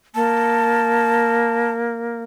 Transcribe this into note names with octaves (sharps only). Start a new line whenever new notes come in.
A#3 A5